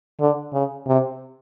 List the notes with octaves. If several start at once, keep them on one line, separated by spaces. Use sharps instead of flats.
D3
C#3
C3